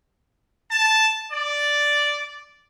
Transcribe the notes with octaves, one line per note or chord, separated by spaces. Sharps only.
A5
D5